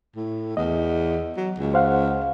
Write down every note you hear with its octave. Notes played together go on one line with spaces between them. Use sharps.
A2
E2 D#5
F#3
C#2
C5 F5 F#5